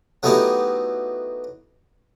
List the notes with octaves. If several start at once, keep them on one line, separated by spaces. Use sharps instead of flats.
F#3 A3 B3 D#4 E4 G4